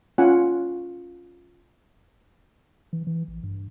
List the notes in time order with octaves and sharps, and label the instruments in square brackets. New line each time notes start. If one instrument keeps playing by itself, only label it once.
[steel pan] C#4 F4 F#5 G#5
[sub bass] E3
E3
A1
G2